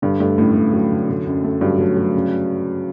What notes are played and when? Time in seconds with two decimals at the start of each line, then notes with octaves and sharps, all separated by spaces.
0.02 G2 D3
0.20 G2 A3
0.37 F#2 A2
0.55 A3
0.73 F#3
0.90 D3
1.09 D3
1.26 F#2
1.44 A3
1.61 G2 F#3
1.79 F#3
1.96 F#3
2.14 C#3